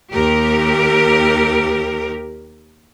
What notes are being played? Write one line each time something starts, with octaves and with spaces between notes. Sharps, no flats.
D#2 G4 A#4